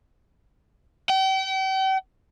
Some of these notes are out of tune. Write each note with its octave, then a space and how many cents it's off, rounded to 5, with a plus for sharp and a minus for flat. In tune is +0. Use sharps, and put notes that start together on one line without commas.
G5 -40